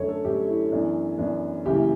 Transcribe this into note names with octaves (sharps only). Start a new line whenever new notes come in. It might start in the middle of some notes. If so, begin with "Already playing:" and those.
Already playing: F#2 D3 A3 C#5
A4
F#2 D3 A3 G4
E4
F#2 E3 B3 D4
F#2 E3 B3 D4
F#1 F#2 E3 G4